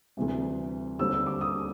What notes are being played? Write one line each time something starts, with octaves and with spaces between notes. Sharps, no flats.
D2 C3 E3 G3
D#2 D3 G3 C4 E6
E6
D6
D#6